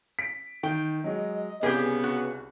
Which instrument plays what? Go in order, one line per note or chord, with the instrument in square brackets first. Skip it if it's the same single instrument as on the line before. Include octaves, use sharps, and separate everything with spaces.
[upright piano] B6 D7
[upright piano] D#3 [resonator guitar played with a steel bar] G5
[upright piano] F#3 G#3 [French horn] D#5
[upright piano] C2 [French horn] C#3 [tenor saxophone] B3 [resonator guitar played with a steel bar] G4 G#4
[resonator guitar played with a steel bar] F#4